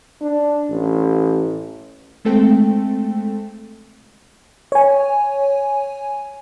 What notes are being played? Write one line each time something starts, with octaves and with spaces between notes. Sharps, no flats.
D4
A1
G#3 A3 C4 A4 G5
C#5 G#5